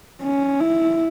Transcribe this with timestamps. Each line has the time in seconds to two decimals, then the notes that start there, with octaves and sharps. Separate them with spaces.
0.22 C#4
0.60 E4